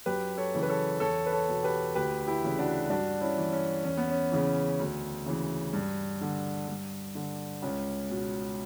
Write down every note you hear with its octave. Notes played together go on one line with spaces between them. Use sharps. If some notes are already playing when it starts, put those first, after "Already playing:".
F#2 G4 B4
A4 C#5
C#3 E3
B4
A4 C#5
E2 A4 C#5
B4
A4 C#5
B2
G4 B4
D2 G4 B4
E4 G4
C#3 E3
D4 F#4
G2 D4 F#4
C#4 E4
E3
C#4
E2 C#4
B3
C#4
C#3 E3
D2
C#3 E3
G2
D3
G2
D3
C#2 C#4
B2